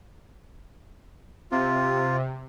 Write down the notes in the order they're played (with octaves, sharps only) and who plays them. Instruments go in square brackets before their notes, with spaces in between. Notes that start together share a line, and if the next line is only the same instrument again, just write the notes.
[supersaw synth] C3 [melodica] F4